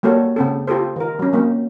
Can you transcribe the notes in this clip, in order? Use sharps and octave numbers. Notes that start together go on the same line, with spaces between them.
G3 A#3 F#4 A4 C#5
C#3 C4 A4
F4 G4 A4 C5
D#3 A#4
F#3 C#4
F#3 A#3 C4